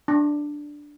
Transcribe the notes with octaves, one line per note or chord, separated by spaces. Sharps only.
D4